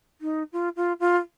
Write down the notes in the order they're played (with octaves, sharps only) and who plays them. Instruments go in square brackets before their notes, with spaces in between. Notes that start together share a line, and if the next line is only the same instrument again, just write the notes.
[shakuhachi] D#4
F4
F4
F4